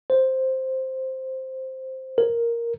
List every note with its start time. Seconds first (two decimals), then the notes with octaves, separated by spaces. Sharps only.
0.10 C5
2.18 A#4